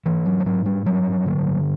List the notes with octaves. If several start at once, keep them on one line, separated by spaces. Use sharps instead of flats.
G#2 E3
F#3
F3
G#2 F#3
G3
G2 F#3
D3